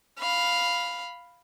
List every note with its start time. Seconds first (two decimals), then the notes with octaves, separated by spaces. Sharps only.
0.19 F5 B5